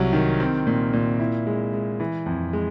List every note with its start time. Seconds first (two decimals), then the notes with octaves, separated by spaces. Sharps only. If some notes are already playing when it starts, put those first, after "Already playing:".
Already playing: C2 F#3
0.13 D#3
0.40 C4
0.67 A#2
0.93 A#2
1.19 E4
1.47 G#3
1.73 G#3
2.00 E3
2.26 F2
2.53 G#3